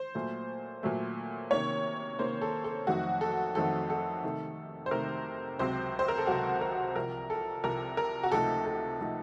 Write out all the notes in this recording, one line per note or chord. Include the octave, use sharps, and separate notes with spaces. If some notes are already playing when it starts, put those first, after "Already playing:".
Already playing: C5
A#2 F#3 A3
A#2 F#3 A3
C3 D#3 A#3 C#4 C#5
C3 D#3 A#3 C#4 C5
A4
A4
F2 D#3 F#3 A3 C4 F#4
A4
F2 D#3 F#3 A3 C4 A4
A4
C3 D#3 A3
C5
C3 D#3 A3 A#4
C#2 C3 F#3 C4 C5
C5
A#4
A4
C#2 C3 F#3 C4 F#4
A#4
C2 C3 F3 A#4
A4
C2 C3 F3 A#4
A#4
F#4
C#2 C3 F3 A3 D#4 A4
A4
C3 F3 A3 D#4